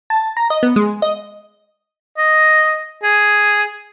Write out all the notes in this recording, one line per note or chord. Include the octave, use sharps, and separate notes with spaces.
A5
A#5
D#5
B3
G#3
D#5
D#5
G#4